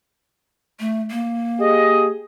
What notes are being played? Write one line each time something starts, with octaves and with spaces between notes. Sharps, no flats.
A3
A#3
G4 G#4 D#5